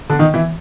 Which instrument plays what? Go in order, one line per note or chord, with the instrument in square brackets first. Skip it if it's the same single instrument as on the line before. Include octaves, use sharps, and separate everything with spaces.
[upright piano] D3 D4
D#3 D#4
E3 E4